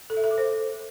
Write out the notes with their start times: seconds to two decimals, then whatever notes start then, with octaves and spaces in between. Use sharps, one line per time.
0.10 A4
0.17 E5
0.24 A4
0.31 D6
0.38 C5